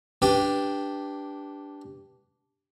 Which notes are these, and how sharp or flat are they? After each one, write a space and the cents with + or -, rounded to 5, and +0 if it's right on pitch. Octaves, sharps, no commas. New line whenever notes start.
D4 -10 G4 +0 B4 +0